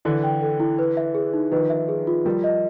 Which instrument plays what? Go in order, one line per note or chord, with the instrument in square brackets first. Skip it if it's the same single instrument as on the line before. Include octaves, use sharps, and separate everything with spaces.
[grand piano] D3 E3 [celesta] D5
[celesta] G5
A4
E4
B4
E5
G#4
D#4
[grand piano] D#3 F3 [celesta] B4
[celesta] E5
G#4
F4
[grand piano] F3 G3 [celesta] A#4
[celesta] D#5